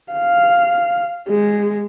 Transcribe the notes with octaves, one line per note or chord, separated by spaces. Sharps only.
F5
G#3